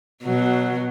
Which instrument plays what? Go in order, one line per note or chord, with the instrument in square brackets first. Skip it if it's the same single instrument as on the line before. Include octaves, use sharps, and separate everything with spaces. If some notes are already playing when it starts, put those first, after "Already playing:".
[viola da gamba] B2 F#3